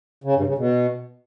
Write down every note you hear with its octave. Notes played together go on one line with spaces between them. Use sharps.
C#3
G2
C#3
B2